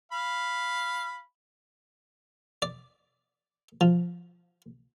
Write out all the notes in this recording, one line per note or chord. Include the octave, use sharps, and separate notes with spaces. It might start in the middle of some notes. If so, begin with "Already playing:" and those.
F5 B5
D5
F3